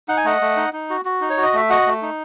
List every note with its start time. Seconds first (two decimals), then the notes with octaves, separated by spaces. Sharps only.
0.08 D#4 F#5
0.17 G#5
0.25 A3 D#5 F#5
0.41 A3
0.57 D#4
0.73 D#4
0.90 F#4
1.05 F#4
1.21 D#4
1.30 C#5
1.37 F#4
1.43 D#5
1.53 A3 E5
1.70 F#4 D#5 F#5
1.86 A3
2.02 D#4